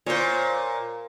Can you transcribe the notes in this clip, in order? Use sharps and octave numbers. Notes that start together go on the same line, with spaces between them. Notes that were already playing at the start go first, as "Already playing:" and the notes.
A#2 C5 C#5